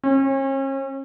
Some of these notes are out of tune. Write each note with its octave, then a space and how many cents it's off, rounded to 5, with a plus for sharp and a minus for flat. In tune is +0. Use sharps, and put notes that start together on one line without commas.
C#4 -40 C#5 -25